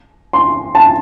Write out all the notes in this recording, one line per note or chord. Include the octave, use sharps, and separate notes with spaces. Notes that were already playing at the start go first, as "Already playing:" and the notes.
C6
A5